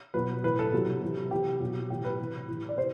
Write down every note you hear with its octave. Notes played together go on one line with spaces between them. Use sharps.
B2 F#3 B4
A2 E3 B4
A4
C3 F#3
C3 E3
C3 E3 G4
B2 F#3
A2 E3 G4
B4
C3 E3
A2 E3
D5
C3 C5